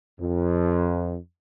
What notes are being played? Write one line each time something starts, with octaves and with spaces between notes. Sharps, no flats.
F2